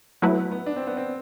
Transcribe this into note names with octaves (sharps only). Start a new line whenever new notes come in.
F#3 A3 B3 E4 B4
B3
B3
D4
C4
B3
C4